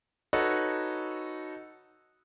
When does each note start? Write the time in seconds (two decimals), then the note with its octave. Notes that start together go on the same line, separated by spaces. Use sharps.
0.33 D#4 F#4 A4 B4 C#5